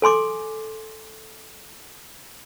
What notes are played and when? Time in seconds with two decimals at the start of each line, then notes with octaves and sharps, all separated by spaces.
0.02 A4 G#5 C6 D6